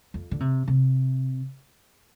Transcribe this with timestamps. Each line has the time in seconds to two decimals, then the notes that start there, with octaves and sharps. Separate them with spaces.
0.14 F2
0.31 D3
0.40 C3
0.68 C3